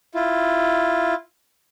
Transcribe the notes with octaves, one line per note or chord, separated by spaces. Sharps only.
E4 F4